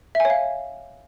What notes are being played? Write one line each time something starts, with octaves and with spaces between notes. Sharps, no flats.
E5
G#5
C#5
F5